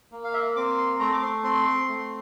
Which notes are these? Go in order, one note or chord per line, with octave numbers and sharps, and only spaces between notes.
A#3
F5
E5
C4 D6
C6
A3 A#5
D6
C6
C4 C6
A3